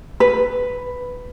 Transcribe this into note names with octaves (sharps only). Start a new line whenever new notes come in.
B4